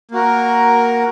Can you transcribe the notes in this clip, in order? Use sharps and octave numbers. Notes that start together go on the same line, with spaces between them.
A#3 F#4 A#4